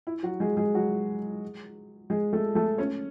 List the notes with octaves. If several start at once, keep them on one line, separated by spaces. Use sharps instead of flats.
E4
F#3 F#4
G#3 G#4
G#3 G#4
F#3 F#4
G#3 G#4
A3 A4
A3 A4
C#4 C#5